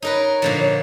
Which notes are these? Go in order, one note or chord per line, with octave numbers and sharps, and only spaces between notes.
D#4 A#4 B4 C#5
A#2 D3 F3